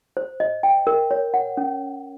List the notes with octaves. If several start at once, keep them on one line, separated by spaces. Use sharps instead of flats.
C5
D#5
G5
A#4
C#5
F#5
C#4